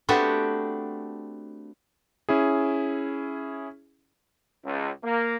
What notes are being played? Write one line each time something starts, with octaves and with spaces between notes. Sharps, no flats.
A3 B3 C4 D4 F#4 G4
C#4 E4 G#4
C#2
A#3